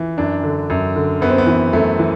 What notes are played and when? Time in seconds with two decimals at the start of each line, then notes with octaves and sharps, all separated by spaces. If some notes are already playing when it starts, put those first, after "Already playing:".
Already playing: E3
0.18 F#2 D4
0.43 D3
0.70 F#2
0.96 D3
1.21 F#2 B3
1.30 C4
1.38 B3
1.47 E3
1.73 F#2 A3
1.99 E3